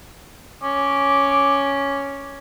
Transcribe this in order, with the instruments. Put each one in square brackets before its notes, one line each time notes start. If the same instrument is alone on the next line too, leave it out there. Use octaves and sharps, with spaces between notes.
[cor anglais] C#4 [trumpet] D6